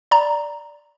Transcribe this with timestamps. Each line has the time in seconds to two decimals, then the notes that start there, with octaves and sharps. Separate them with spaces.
0.11 D5 A#5